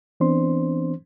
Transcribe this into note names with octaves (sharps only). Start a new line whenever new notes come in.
E3 B3 C4 D4 C5 C6